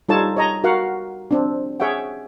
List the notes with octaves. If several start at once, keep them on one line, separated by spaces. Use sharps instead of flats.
G3 D#4 F4 A4 C#5 A5
C#5 D#5 A#5
F#4 A#4 F5 F#5
C4 D4
G#4 C#5 E5 F#5 G5